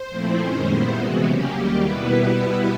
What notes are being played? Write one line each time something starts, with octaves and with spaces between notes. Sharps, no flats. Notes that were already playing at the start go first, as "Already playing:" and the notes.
Already playing: C5
A#2 F3 A3 C4 E4
F#2 D#3 G#3 C#4
A#2 G3 B3 E4
C3 E3 G#3 B3 F#4
C#3 F#3 A#3 C#4 G4
D#2 D#3 G3 A#3 G4
B2 G3 B3 E4 B4